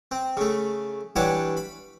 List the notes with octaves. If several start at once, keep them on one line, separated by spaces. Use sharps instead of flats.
C4
C#3 A3
E3 G3 D4 C#5 F#5 D6
B5